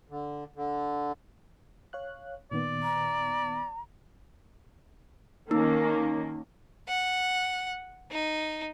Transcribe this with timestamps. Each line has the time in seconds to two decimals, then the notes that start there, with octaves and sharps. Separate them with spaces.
0.10 D3
0.56 D3
1.93 C#5 F5 F#6
2.51 A#2 D#3 B3 D5
2.83 A#5
5.51 D#3 A#3 C#4 D#4
6.88 F#5
8.11 D#4